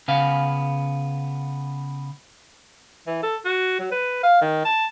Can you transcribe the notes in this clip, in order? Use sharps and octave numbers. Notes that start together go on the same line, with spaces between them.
C#3 B3 F5
E3
A4
F#4
F#3
B4
F5
D#3
A5